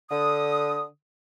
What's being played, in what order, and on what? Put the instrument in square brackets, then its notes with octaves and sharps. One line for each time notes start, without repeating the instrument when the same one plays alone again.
[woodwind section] D3 D#6